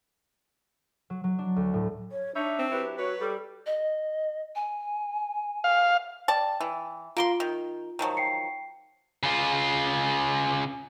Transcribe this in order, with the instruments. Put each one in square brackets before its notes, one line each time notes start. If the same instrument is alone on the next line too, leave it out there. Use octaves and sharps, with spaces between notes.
[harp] F#3
F#3
D4
D2
A2
[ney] C#5
[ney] D4 [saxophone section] D#4 C#5 E5
[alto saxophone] C4
[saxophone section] F#3 E4 G4 [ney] B4
[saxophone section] F#3 C#5 [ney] F#4 [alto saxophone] B4
[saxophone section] G3 [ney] A4
[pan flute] D#5
G#5
[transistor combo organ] F5
[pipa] D5 A5 [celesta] G5
[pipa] E3
[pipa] A#3 A#4 C6 [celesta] F4 D7 G7
[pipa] D#3
D#3 F3 F#3
[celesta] G5 C7 C#7
[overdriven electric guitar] C#3 F4